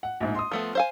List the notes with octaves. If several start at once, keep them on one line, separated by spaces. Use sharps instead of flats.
F#5
A#1 G#2
C6 D#6
F3 A3 B3
C5 F5 G#5